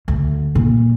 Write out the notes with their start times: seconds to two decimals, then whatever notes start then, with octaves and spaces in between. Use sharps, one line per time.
0.08 D2
0.55 A#2